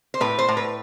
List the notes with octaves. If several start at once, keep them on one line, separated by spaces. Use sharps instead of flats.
C5
A2 B4
C5
A2
B4